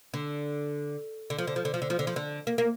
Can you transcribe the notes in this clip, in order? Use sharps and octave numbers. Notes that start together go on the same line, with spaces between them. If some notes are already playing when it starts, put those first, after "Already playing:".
D3
D3
F3
D3
F3
D3
F3
D3
F3
D3
F3
D3
A#3
A#3